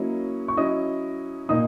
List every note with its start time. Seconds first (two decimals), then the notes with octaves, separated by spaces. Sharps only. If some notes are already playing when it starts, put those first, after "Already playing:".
Already playing: F#3 A#3 C#4 E4 D#5
0.48 C#6
0.57 F#3 C#4 E4 D#5 D#6
1.49 A#2 A#3 D#4 D#5 D#6